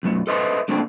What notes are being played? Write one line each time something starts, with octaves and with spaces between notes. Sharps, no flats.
B1 F#2 A3
A4 B4 C5 D#5 E5 C6
D3 A3 A#3 C4 D4